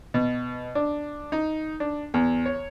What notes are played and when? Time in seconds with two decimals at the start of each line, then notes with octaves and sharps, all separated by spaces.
0.14 B2
0.75 D4
1.32 D#4
1.80 D4
2.14 E2
2.46 C#5